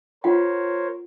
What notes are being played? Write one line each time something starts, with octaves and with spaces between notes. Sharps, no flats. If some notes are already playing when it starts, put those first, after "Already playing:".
F4 A#4 C5 C#5 F#5